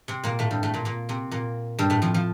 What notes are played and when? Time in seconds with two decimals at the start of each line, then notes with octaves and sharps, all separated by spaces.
0.08 C3 C4
0.24 A#2 A#3
0.39 A2 A3
0.51 G2 G3
0.63 A2 A3
0.74 A#2 A#3
0.85 A#2 A#3
1.09 C3 C4
1.31 A#2 A#3
1.79 G2 G3
1.90 A2 A3
2.02 F2 F3
2.14 F3